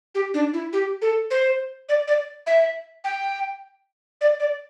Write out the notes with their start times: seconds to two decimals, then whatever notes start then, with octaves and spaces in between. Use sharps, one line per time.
0.15 G4
0.34 D4
0.53 E4
0.73 G4
1.02 A4
1.31 C5
1.89 D5
2.08 D5
2.47 E5
3.04 G5
4.21 D5
4.40 D5